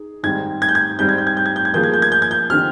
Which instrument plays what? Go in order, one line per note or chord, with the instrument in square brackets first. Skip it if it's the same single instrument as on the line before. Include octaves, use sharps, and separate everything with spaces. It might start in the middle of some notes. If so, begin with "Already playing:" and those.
Already playing: [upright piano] D#4 G#4
[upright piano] G#2 D#3 G3 C4 [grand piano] G#6
[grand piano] G#6
G6
G#6
[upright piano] G#2 G3 C4 [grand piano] G6
[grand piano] G#6
G6
G#6
G6
G#6
G6
G#6
[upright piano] F3 A#3 F4 G#4 [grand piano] G6
[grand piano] G#6
G6
G#6
G6
G#6
G6
[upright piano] D3 F3 C4 D#4 G4 [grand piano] F6